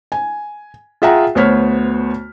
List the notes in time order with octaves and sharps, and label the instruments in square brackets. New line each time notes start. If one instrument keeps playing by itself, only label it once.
[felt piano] G#5
F4 G#4 E5 F#5 G5 A#5
D2 B3 C5 C#5 F6 B6